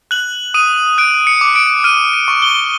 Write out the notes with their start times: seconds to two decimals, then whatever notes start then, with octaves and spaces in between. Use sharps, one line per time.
0.11 F#6 F#7
0.54 D#6 D#7
0.98 F#6 D7
1.27 C#7
1.41 D6
1.56 D7
1.84 F6 D#7
2.13 D#7
2.28 C#6
2.42 G7